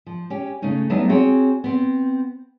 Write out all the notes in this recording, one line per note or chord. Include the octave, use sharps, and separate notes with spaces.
F3
C#4 G4
C#3 A3 C#4 D#4
F#3 G3 A3 B3 D#4 E4
C4 F#4 G#4 C#5
B3 C4